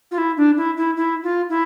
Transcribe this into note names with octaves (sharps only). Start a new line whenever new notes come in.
F4
E4
D4
E4
E4
E4
F4
E4